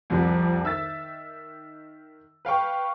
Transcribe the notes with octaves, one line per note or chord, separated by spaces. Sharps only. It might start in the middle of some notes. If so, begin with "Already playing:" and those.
C2 F2 C3 F3 G3
D#3 E5 E6 A6
B4 F5 G5 C#6